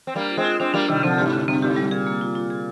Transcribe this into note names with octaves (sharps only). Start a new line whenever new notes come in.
C4
G3 A#3 D4
F4
G#3 C4
F4
G#3 C4 D4
G3 A#3 D4
C3 D#3 G3
D3 F3 C4
G2 G4
G#2
D3
G2 C4
A#2 G4
G#2
G3
A#2 G#4
A#3
F4
F4
G#4